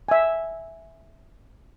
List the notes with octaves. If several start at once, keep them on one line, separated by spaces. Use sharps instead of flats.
E5 G#5